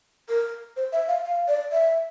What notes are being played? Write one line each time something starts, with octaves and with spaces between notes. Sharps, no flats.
A#4
C5
E5
F5
F5
D5
E5